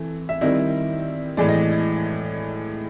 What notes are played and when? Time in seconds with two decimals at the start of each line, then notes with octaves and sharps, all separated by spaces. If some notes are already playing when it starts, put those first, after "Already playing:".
Already playing: E3 A3 C4
0.29 E5
0.41 D#3 G3 C4 E4 D#5
1.37 A2 E3 G#3 D5
1.49 D#5